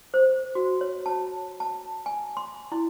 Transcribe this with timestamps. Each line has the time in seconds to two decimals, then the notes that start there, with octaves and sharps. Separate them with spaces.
0.14 C5
0.55 F#4
0.81 C#5
1.06 A5
1.60 A5
2.06 G#5
2.37 C6
2.72 E4